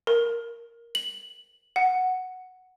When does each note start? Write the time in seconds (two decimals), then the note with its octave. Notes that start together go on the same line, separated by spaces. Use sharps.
0.07 A#4
0.95 F#7
1.76 F#5